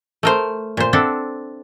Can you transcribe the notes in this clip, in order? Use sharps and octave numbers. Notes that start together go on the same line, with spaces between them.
A3 A#4 C5
A#2 C5
C4 D4 A4 E5 F#5